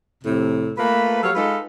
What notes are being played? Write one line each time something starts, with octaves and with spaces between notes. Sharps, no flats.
F2 A2 C3
A3 A#3 F4 B4
F#3 G4 A4 C#5 F5
G#3 D#4 F4 A4 B4